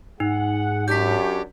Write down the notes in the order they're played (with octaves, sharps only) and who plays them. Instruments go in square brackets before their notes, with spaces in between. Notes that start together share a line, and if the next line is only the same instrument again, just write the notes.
[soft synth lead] G#2 [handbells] D#4 [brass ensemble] G#4 F#5
[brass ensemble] F#2 D4 C#5 [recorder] G4 [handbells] G6 B6